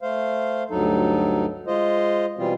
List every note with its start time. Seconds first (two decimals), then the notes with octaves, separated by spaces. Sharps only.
0.02 A3 C5 F5
0.71 D2 G2 F#3 D#4 A4
1.67 G#3 F4 C5 D#5
2.38 B2 E3 G3 C4 F4